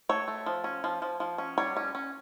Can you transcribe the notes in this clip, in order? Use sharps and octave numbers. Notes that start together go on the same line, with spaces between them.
A3 C#5
A3
F3
C#4
F3
F3
F3
C#4
G3 C#5
C#4
C#4